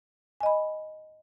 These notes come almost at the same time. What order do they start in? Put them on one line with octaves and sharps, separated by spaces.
G#5 D#5 B5